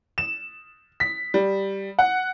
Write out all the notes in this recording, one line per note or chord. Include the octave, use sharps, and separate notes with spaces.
E7
B6
G3
F#5